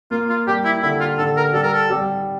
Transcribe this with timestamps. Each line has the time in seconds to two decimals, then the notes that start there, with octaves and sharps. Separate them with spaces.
0.11 A#3 F4
0.29 F4
0.47 G3 G4
0.65 E4
0.83 D3 E4
1.00 F4
1.18 D3 A4
1.37 A#4
1.53 G3 A4
1.63 A#4
1.73 A4
1.90 G3